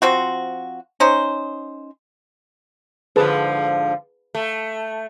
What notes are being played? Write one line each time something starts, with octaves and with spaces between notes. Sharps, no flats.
F3 C4 F#4
C#4 D#4 C5
G#2 D3 F3 G#4 B4 A5
A3